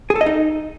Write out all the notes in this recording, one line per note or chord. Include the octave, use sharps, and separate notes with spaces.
G#4
A4
D#5
D#4